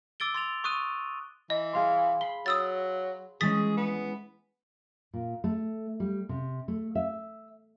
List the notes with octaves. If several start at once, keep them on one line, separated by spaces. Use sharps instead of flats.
D6 E6 A6 D7 G7
C6 A6 F7
C#6 D#6 F#6 D#7
E3 D#5
G#4 F5 C6
B5 C7 G7
F#3 D#6 E6 A6
E3 G#3 C#4 G#4 D#6 A6 B6
B3
A#2
A3
G3
C3
A3
E5